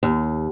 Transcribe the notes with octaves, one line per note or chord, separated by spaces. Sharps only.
D#2